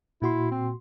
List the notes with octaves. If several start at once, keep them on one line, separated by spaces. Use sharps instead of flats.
A#2 E4 F#4 C6
C4